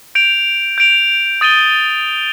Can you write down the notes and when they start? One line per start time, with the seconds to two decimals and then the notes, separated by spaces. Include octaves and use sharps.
0.15 G6 D7 F7
0.78 G6 D7 F7
1.41 D#6 A6 D#7 G7